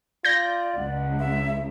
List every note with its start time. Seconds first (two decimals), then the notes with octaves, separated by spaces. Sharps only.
0.25 F4 D5 G6 A#6
0.78 C#2 F#5
1.19 E5